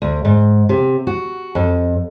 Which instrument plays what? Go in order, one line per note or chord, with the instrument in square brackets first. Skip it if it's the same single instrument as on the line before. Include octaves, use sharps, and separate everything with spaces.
[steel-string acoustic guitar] D2
G#2
C3
F#4
F2